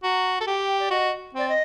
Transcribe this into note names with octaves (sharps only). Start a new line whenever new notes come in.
F#4 A#5
A4
G4 G5
D5
F#4 D#5
C4 D5
D#5